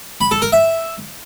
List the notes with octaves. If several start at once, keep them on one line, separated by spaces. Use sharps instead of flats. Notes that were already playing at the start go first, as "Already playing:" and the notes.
B5
A4
A#4
E5